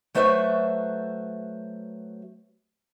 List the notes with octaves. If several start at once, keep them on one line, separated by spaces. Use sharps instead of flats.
F#3 A3 F#4 B4 C5 E5